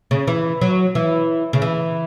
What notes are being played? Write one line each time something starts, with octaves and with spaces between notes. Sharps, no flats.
C#3
E3
F#3
E3
C#3
E3